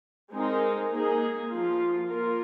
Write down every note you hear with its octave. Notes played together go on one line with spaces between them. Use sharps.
G#3 C4 D#4 A#4
A#3 D#4 G#4
F3 A#3 F4
A#3 F4 A#4